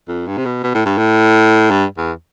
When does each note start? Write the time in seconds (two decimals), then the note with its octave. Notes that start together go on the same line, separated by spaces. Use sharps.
0.08 F2
0.27 G2
0.37 C3
0.45 B2
0.63 B2
0.75 A2
0.86 G2
0.98 A2
1.71 G2
1.98 E2